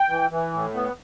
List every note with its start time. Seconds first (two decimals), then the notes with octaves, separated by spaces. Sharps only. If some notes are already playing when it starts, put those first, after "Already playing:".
Already playing: G5
0.10 E3
0.31 E3
0.53 A2
0.74 B3